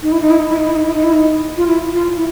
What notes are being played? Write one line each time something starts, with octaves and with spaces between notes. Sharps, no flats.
D#4
E4
D#4
E4
D#4
E4
D#4
E4
D#4
E4
D#4
E4
D#4
F4
E4
F4
E4